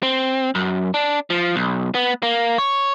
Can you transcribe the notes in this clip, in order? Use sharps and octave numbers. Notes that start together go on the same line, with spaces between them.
C4
F#2
D4
F3
B1
B3
A#3
C#5